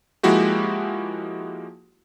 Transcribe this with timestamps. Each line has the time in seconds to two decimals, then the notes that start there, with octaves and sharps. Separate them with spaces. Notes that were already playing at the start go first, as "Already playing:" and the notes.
0.23 F3 G#3 A#3 E4 F#4 G4